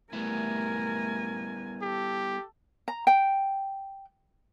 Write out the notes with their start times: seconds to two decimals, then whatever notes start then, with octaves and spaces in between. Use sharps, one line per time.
0.13 G3 A3 B3 E4 A#4 G#5
1.82 G4 A4
2.88 A#5
3.07 G5